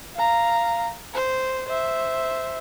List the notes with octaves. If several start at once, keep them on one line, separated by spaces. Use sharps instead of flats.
F5 A#5
C5
C5 E5